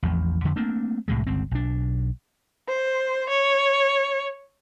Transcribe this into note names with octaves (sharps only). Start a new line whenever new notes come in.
A1 E2 F3
F2 D3
A3 A#3 C4 D4
C2 A2 C3 G#3
G1 C#2 C4
B1 D4
C5
C#5